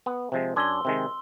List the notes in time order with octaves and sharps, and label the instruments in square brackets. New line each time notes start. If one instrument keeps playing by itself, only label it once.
[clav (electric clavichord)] B3
C3 F3 G#3
[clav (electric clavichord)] F#2 D4 G#5 [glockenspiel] C6 E6 G7
[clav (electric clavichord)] C3 D#3 G#3